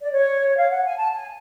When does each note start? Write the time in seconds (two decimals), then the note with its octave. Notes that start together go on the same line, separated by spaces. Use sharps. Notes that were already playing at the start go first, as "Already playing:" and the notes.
0.02 D5
0.11 C#5
0.57 F5
0.71 F#5
0.84 G#5
0.96 A5
1.14 G#5